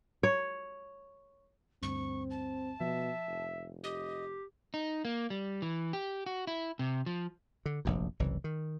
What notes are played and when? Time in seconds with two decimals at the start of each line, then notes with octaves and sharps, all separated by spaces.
0.23 C#5
1.83 D2 G2 C4 C#6
2.30 A5
2.81 B2 F3 E5
3.27 F1
3.84 G4 D#5
4.74 D#4
5.05 A#3
5.30 G3
5.62 E3
5.93 G4
6.26 F#4
6.47 E4
6.79 C3
7.06 F3
7.66 D3
7.85 F1 A#1 F#2
8.20 F#1 C2 E3
8.44 D#3